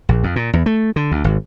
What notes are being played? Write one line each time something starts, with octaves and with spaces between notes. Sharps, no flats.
A#1
F2
A#2
E2
A3
D3
D2
G#1